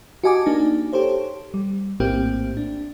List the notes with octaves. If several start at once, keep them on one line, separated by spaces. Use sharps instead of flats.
F#4 G4 D#5 G#5 A5 D6
A#3 D4 D#4
G4 A4 C5 C#5
G3
A#1 A2 A#3 C4 G4
D4